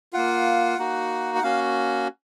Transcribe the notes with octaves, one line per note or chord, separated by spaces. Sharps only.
A#3 F4 F#5
A#3 D#4 F#4
F#5
A#3 C#4 F#4 F5